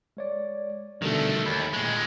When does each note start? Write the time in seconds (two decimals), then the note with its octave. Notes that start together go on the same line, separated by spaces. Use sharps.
0.17 G#3 C#5 D5
1.02 B2 D3 D#3 G3 A3
1.46 D#2 B5
1.73 A#2 G#3